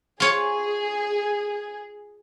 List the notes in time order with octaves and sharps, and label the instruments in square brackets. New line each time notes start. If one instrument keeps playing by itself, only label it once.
[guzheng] F4 C#5 [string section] G#4